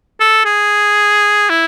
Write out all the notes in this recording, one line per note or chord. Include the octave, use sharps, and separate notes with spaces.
A4
G#4
E4